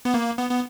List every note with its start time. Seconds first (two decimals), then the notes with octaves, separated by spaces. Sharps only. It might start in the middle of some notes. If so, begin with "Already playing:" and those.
0.05 B3
0.14 A#3
0.37 B3
0.50 B3